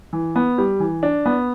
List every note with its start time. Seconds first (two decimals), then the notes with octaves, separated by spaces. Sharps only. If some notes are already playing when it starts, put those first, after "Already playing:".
0.13 E3
0.36 B3
0.58 G3
0.80 E3
1.03 D4
1.26 B3